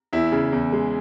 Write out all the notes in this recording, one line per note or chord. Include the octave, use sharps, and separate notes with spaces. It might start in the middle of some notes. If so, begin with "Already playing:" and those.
E2 E4
C#3
E2
G#3